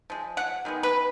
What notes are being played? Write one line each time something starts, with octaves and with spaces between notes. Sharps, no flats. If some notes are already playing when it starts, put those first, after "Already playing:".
F3 G#3
F#5
D#3 G#3 B3
B4